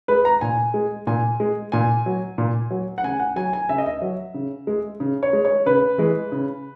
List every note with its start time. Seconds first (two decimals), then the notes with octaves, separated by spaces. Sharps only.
0.08 G#3 B4
0.25 A#5
0.41 A#2 G#5
0.74 G#3
1.07 A#2 G#5
1.40 G#3
1.72 A#2 G#5
2.06 F#3
2.38 A#2
2.71 F#3
2.98 F#5
3.03 C#3 G#5
3.20 F#5
3.36 F#3 G#5
3.53 G#5
3.69 C#3 E5
3.78 D#5
3.86 E5
4.02 F#3
4.34 C#3
4.67 G#3
5.00 C#3
5.23 C#5
5.33 G#3
5.45 C#5
5.66 C#3 B4
5.98 E3 G#3
6.32 C#3